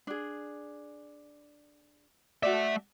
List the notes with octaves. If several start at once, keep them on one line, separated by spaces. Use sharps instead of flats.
D4 G#4
A3 F#4 D5 E5